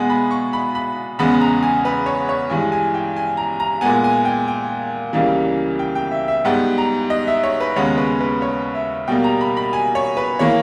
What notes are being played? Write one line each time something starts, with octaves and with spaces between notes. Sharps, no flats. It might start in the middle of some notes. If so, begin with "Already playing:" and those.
Already playing: B2 G#3 B3 G#5
B5
C#6
B5
B5
E2 C#3 G#3 B3 B5
A#5
G#5
B4
C#5
C#5
G2 E3 G#3 G#5
G#5
G5
G#5
A#5
A#5
A#2 G#3 B3 G#5
G#5
G5
G5
C#2 C#3 E3 G3 A#3
G5
G5
E5
E5
G#2 G3 B3 G5
A#5
D#5
E5
C#5
B4
D#2 C#3 G#3 B3 C#5
B4
B4
C#5
E5
B2 G3 A#3 G5
A#5
B5
B5
G#5
C#5
B4
E3 A#3 C#5